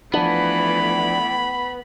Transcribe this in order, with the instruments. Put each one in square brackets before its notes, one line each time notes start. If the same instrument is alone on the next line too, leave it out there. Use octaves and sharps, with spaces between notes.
[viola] E3 A3 [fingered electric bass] F3 D4 [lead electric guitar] B3 [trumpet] B5